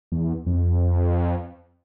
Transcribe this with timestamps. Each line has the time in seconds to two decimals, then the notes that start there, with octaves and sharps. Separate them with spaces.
0.12 E2
0.46 F2